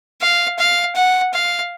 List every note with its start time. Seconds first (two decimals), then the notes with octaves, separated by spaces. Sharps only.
0.21 F5
0.58 F5
0.95 F#5
1.34 F5